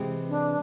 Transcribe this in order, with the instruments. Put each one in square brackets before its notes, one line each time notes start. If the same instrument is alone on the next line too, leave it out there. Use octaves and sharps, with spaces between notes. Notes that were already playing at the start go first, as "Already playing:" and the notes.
Already playing: [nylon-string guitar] C3 E3 G#3 C4
[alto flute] D4